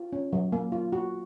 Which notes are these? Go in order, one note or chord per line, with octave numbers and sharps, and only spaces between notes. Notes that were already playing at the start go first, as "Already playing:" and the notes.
Already playing: F4
C#4
F#3
A#3
F4
F#4